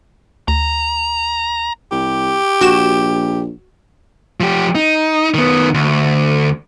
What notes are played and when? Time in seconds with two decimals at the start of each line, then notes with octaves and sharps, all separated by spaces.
0.48 D2 A#5
1.92 C2 G4
2.61 A#1 F#4 E7
4.40 F3 G4
4.75 D#4
5.34 D#3 B3
5.74 D2